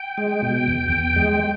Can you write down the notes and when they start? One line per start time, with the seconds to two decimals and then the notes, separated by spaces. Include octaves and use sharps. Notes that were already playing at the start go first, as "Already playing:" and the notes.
Already playing: G5
0.18 G#3
0.43 B2
0.68 E2
0.92 E2
1.16 G#3